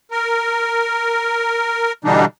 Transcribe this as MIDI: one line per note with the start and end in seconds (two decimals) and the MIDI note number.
0.11 1.92 70
2.04 2.25 47
2.04 2.25 50
2.04 2.25 52
2.04 2.25 55
2.04 2.25 62
2.04 2.25 63